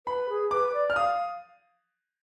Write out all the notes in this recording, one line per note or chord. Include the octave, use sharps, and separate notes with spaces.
B4 B5
G#4
B4 D6
D5
F6
F5 D#6